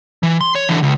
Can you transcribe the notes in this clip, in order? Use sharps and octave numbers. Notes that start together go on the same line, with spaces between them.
E3
C6
C#5
D3 E3
C#2